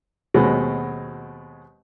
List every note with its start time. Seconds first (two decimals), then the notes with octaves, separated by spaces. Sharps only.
0.34 D#2 B2 F#3 G#3 B3 C4